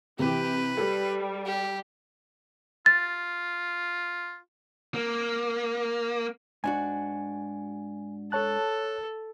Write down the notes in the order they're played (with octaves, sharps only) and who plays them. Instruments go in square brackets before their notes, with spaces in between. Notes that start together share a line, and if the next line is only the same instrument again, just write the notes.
[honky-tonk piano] C3 E3 [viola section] G4 [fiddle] B4
[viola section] G3 [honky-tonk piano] A4
[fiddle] G4
[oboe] F4 [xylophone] A6
[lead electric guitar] A#3
[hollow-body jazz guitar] G#2 D4 F#4 [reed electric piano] G#5
[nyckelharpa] A4 [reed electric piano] C#5 A5 F#6